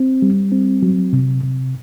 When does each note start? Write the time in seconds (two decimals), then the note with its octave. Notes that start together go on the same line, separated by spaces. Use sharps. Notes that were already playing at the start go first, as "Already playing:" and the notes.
Already playing: C4
0.22 G3
0.52 C4
0.83 F#3
1.13 C3
1.43 C3